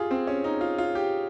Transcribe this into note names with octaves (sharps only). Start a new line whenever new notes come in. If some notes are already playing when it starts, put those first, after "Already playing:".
Already playing: F4 G4 G#4
C4
C#4
D#4
F4
F4
G4